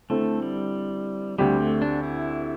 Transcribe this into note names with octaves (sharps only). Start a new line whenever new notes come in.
D3 A3 C4 E4 A4 C5
G3
D2 D3 G3 C4 G4
A3
D4
E4